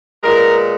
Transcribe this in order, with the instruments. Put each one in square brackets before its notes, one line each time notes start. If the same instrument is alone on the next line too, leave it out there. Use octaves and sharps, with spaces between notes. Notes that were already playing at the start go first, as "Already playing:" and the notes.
[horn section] A#2 G#3 B3 A#4